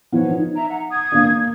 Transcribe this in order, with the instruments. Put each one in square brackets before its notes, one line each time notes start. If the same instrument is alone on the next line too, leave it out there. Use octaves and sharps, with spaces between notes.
[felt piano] F3 B3 [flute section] C#5
[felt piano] D#4
[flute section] E5 A#5
F#5
D#6 G#6
[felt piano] A#3 D4